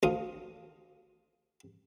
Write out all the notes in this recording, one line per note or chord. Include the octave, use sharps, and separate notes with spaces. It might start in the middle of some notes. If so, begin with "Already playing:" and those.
D2 F4 D#6